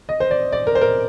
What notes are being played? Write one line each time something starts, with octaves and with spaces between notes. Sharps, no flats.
D#5
C5
D5
D5
A#4
C5
A#4